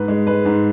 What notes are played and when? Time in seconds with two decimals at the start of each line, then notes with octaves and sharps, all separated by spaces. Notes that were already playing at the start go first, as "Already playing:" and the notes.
Already playing: G#2 B4
0.08 G#3
0.27 G#3 B4
0.45 G#2